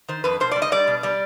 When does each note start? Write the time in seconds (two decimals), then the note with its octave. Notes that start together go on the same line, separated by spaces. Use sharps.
0.08 D#3 C5
0.24 F2 B4
0.40 B2 C5
0.51 D5
0.56 G3
0.62 D#5
0.72 G3 D5
0.87 B2
1.03 G3 D5